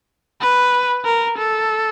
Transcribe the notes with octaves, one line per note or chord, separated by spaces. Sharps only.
B4
A#4
A4